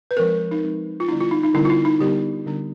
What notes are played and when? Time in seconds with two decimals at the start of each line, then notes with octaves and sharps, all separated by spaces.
0.11 B4
0.17 F3 G#3 C4 A#4
0.51 D#4
0.63 F3 G#3 C4
1.00 F4
1.08 D3 G3 B3 D4 E4
1.21 F4
1.31 D#4
1.44 D#4
1.54 D3 G3 B3 D4 E4
1.65 F4
1.70 E4
1.85 D#4
2.00 D3 G3 B3 D4 G4
2.46 D3 G3 B3 D4